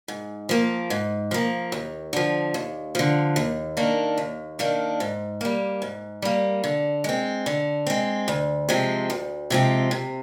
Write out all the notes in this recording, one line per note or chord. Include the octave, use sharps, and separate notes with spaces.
G#2
F3 A#3
G#2
F3 A#3
D#2
D3 F3
D#2
D3 F3
D#2
D#3 A#3 D4
D#2
D#3 A#3 D4
G#2
G3 A#3
G#2
G3 A#3
D3
G#3 C4
D3
G#3 C4
D2
C3 F3 G#3 C4
D2
C3 F3 G#3 C4
C3